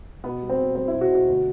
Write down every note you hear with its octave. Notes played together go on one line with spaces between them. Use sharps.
B2 B3
G3
C4
B2
G3 C4
B2 E4
F#4
B2
F#4
D2